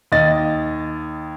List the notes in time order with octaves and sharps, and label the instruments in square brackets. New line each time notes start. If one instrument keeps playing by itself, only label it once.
[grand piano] D#2 D#5 A6